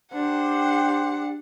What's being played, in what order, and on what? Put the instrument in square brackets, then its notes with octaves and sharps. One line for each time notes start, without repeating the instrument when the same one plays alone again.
[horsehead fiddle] D4 [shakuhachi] G4 [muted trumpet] C5 [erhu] F#5